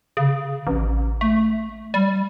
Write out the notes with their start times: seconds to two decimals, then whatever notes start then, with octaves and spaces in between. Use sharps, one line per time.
0.17 C#3
0.67 A1
1.21 A3
1.94 G3